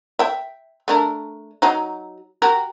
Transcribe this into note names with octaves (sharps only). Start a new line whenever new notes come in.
E5 G5
A3 D4 A#4
F#3 D#4
F#4 G4 A#4